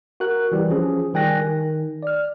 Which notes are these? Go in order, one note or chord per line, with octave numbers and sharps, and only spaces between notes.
F#4 A#4 F#6
E3 G3 G4
F3 C#4 G#4
D#3 G3 G5 G#5 F#6 A#6
D#3
D5 F6